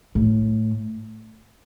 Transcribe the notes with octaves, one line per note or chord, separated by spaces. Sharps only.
A2